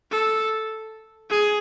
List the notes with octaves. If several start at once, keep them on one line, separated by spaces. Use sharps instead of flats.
A4
G#4